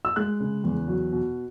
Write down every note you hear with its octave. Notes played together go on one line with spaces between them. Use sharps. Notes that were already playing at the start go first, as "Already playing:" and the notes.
E6
G#3 F#6
C#3
E2
F#3
B2